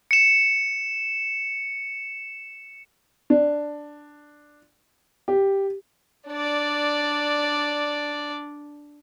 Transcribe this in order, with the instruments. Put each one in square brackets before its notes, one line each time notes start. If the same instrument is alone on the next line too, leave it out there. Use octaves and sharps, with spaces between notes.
[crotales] C#7 E7
[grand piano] D4
G4
[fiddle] D4 D5